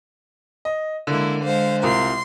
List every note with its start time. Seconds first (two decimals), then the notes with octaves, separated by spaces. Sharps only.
0.65 D#5
1.07 D3 G#3 A#3 E4
1.44 G#3 C5 F5
1.83 C2 F4 A#4 C6